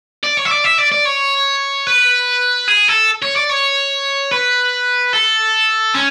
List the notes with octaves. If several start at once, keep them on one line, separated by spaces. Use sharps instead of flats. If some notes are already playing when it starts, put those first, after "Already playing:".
D5
C#5
E5
D5
E5
D5
D5
C#5
B4
G#4
A4
C#5
D5
C#5
B4
A4
C#4